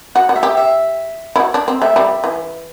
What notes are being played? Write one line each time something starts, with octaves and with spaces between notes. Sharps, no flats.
F#4 F#5
F#4
E5
G4
E5
E4
F#4
D4
C4
A3 E5
G3
E3